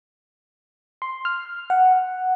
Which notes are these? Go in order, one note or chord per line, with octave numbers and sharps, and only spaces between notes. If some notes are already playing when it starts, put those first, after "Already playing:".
C6
F6
F#5